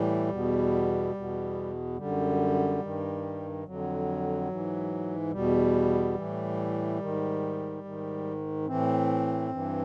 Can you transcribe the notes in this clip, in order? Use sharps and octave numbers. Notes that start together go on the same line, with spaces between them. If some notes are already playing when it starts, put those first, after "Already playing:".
Already playing: A2 E3 G3
E2 B2
E2 B2
F#2 D3 G3
G2 D#3
F2 D3 F#3
G#2 E3
E2 B2 G3
A2 E3
G#2 D#3
G#2 D#3
A2 E3 C4
G2 E3